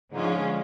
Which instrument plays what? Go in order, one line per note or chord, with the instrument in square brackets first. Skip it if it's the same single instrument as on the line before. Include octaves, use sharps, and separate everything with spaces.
[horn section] G#2 [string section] D3 F3 G#3 C#4 F4